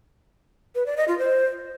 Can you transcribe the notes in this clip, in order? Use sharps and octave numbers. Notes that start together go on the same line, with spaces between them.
B4
D5
D#5
F4
C5